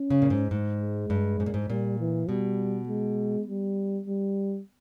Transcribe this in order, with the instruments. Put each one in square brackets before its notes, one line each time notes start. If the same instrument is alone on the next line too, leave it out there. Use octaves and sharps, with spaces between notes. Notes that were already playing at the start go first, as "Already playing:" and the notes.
Already playing: [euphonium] C#4
[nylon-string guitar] C#3
A#2
G#2
G#2
[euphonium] G#3
[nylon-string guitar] G2
G#2
A#2
G#2
[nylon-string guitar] A#2 [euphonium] G3
[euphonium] E3
[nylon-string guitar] B2 [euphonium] G3
[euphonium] G#3
G3
G3